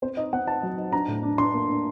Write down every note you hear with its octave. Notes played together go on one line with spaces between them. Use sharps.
C4 C5
D#4 D#5
C4 F#5
D#4 A5
F#3
D#4
D4 A#5
A2
D4
D4 C6
A#3
D4